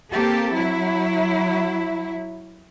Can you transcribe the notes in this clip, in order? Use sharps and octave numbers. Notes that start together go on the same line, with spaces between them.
A#3 C4 G4 A4
F#3 E4